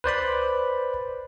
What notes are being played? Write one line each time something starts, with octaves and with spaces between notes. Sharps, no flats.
B4 C5 D5 B5